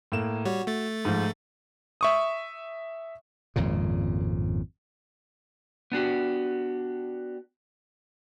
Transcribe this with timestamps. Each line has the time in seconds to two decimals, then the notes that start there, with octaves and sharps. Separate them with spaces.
0.12 A2 A#3 E7
0.45 G3 F#4 C#5
0.67 A3 A6
1.05 G#2 F3
2.01 E5 C#6 D#6
3.56 G#1 F2 A#2 C#3
5.92 B3 D4 F#4 G4